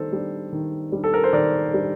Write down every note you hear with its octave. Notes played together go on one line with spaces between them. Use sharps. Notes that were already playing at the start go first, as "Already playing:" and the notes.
Already playing: D#3 G3 D4 A4 C5
G3 D4
D#3
G3 D4
A4
A#4
C5
D#3 A#4 D5
G3 D4